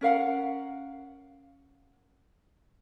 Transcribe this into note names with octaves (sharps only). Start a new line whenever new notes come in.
C#4 A#4 F5 F#5